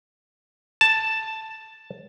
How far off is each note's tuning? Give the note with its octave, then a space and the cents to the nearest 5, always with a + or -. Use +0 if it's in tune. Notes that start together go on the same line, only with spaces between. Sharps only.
A5 +5